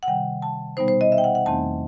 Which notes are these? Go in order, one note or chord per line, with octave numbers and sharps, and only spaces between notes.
F#5
C3 D#3 G3 G5
A5
B2 G3 B3 D#4 C5
C5
D#5
E5
G5
F#5
F#5
E2 D#3 A3 C4 D#4 A5